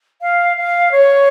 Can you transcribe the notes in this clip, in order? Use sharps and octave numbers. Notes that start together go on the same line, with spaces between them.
F5
F5
C#5